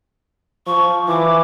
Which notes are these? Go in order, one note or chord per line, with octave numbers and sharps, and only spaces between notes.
F3 C#6
E3 D6